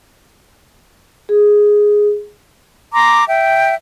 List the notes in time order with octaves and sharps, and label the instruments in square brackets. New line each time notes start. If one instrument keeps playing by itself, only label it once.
[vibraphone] G#4
[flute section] A#5 C6 D6
E5 G5